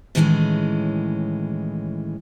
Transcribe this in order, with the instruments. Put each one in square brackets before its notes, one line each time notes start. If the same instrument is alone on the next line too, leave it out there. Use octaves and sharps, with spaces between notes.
[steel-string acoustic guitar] A2 D#3 E3 G3 G#3 C#4